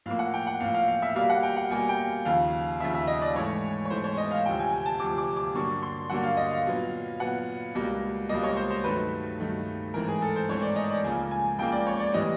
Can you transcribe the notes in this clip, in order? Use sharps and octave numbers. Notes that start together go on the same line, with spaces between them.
A2 F3 A#3 F5
F#5
G5
F#5
A2 F3 A#3 F5
F5
F5
E5
B2 G3 A#3 F5
F#5
G5
F#5
B2 G3 A#3 G#5
G5
D#2 C#3 F3 F5
D#2 C#3 F3 E5
E5
D#5
D5
G#2 E3 A3 C#5
C#5
G#2 E3 A3 C5
C#5
D#5
F5
D2 C3 F3 G5
G#5
G#5
A5
D2 C3 F3 D6
D6
D6
G2 D3 F#3 A#3 C#6
C6
G2 D3 F#3 A#3 F#5
F5
D#5
F5
A#2 F#3 B3
A#2 F#3 B3 F#5
C#2 B2 G3 A#3
C#2 B2 G3 A#3 D#5
C#5
C5
C5
G2 D#3 F#3 A3 B4
G2 D#3 F#3 A3
G#2 E3 A3 C4 A#4
G#4
A4
C5
G#2 E3 A3 C4 C#5
D5
D#5
D5
C#2 C#3 F3 A#3 G#5
G#5
C#2 C#3 F3 A#3 G5
D5
C#5
D5
A2 E3 G3 B3 D#5